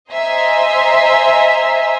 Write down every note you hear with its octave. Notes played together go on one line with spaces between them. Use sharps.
C5 D#5 E5 G#5 A#5 C6